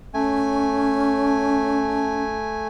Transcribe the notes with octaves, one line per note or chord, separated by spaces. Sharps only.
A3 C#4 G#5